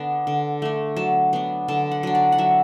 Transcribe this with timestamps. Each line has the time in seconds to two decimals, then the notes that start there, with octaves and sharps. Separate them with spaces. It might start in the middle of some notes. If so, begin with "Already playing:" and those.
Already playing: D3 B3 D4
0.27 D3
0.62 A3 D4
0.96 F#3 A5
1.33 B3 D4
1.68 D3 A5
1.91 F#5
2.03 F#3 D4
2.15 D5
2.32 F#5
2.38 F#3 E5